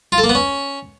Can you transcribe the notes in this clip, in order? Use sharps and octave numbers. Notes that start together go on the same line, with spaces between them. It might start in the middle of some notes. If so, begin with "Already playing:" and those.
F4
A4
A#3
B3
C#4